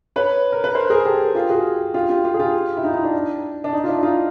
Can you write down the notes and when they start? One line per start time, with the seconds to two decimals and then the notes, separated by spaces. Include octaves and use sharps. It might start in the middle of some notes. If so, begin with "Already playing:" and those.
0.16 B4 C#5
0.52 A#4
0.64 B4
0.75 A#4 C5
0.90 G#4 A#4
1.05 G4 A4
1.35 F4 G4
1.50 F#4 G#4
1.94 F4 G4
2.09 F4 G4
2.24 F4 G4
2.34 G#4
2.39 F4 G4
2.77 E4
2.83 D#4 F4
2.94 D#4
3.04 D4
3.64 D4
3.73 D#4
3.84 F4
3.88 D4 E4
4.03 D#4 F4